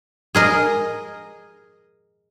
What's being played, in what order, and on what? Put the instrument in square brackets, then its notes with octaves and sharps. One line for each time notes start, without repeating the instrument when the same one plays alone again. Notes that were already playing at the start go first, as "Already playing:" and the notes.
[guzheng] G#4 A#4 D#5